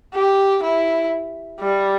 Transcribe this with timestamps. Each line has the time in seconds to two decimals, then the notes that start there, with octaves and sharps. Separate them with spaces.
0.14 G4
0.63 E4
1.60 G3